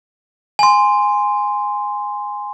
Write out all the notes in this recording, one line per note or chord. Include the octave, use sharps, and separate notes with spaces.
G#5 C6